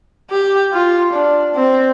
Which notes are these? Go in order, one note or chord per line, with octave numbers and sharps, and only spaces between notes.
G4
F4
D4
C4